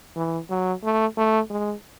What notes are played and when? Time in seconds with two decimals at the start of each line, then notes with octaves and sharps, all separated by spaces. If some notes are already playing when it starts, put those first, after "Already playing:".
0.16 E3
0.49 F#3
0.83 A3
1.17 A3
1.50 G#3